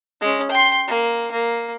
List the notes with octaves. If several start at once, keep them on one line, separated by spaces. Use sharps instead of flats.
G#3 C#4
G5 C6
A#3
A#3